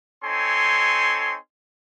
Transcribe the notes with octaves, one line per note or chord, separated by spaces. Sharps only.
C4 D#4 A4 C#5 G#5 C6